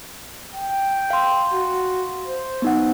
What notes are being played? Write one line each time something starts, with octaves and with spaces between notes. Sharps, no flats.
G5
F5 C6
F#4
C5
B3 D#4 F#5